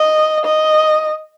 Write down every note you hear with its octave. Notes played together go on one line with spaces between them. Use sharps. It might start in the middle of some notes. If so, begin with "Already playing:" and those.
Already playing: D#5
D#5